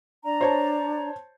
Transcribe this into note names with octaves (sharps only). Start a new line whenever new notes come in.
D4 D5 A#5
C5 C#5 A5